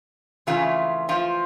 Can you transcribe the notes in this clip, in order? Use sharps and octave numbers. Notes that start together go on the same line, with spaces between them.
F2 C#3 E3 A3 F4
F3 F4